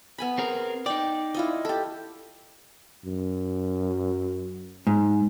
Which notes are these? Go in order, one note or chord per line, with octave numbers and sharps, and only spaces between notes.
B3 G#5 B5
C4 G#4 A#4
D#4 D5 G5
E4 F4 D#5
G4 A4
F#2
G#2